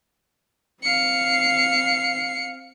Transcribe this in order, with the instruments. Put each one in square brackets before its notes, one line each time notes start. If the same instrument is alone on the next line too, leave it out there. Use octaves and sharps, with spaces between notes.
[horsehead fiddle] C4 F5 [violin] C7 C#7